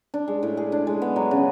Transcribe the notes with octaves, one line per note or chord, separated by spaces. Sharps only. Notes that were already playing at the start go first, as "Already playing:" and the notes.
D4
G#3
A2
G#4
D4
G#3
B3
F#3
C#3